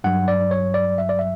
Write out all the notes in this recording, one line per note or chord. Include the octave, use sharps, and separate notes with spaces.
G2 F#3 F#5
D5
C#5
D5
E5
D5
E5